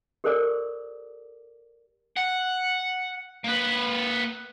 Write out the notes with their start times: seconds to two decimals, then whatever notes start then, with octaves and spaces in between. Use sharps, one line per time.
0.24 G4 A4 A#4 C5 D5 D6
2.17 F#5
3.44 A#3 B4